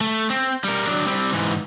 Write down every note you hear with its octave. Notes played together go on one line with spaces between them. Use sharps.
A3
C4
G3 A#4
F#3 D4
G3 C4
G#2 E3